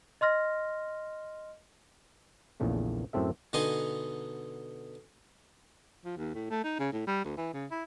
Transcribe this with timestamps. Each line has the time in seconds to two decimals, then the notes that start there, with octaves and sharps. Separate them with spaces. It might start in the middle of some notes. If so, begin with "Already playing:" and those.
0.21 D#5 C6 F6 A#6
2.60 A#1 E2 A#2 C#3 A3
3.13 F#2 A2 C4 A4 E5
3.53 B2 D3 D#4 D#5 G#5 C6
6.05 F3
6.17 D#2
6.35 A2
6.50 A3
6.64 D#4
6.79 C#3
6.93 A2
7.07 G3
7.25 D2
7.37 E3
7.53 C#3
7.71 E4